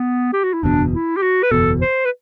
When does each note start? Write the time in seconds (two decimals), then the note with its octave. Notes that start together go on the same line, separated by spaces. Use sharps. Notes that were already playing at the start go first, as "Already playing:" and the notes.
Already playing: B3
0.33 G4
0.44 F#4
0.53 E4
0.63 F#1 E2 B2 D4
0.93 E4
1.17 G4
1.22 F#4
1.43 B4
1.51 F#1 E2 B2 A4
1.81 C5
2.05 B4